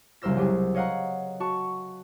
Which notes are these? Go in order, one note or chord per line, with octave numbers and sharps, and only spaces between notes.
F#1 C2 A#4 C5 E6 A#6
F#3 G4 G#4
C#5 D#5 F5 F#5 A#5
F#4 A5 C#6